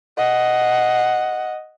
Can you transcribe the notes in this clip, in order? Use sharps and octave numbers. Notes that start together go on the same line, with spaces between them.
D#5 F#5